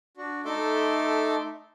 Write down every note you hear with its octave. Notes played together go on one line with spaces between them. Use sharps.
D4 F#4
A3 D#4 A4 E5 C6 D6